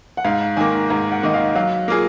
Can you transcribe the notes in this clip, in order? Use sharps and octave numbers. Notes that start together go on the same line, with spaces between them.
F#5
G#2 F5
D#3 A#3 G#5
G#2 A#5
F#5
D#3 A#3 D#5
F5
F#3 F5
A#3 F4 G#4